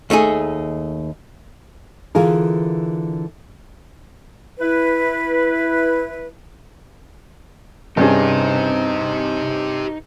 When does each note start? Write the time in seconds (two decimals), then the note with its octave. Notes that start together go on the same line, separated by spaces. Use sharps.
0.10 D#2 A3 D#4 G#4
2.15 D3 E3 F4 G#4 A#4
4.60 E4 B4
7.97 G2 C3 C#4 D#4 G4 G#4 C5